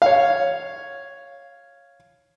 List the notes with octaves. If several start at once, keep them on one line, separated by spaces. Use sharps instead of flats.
C#5 F5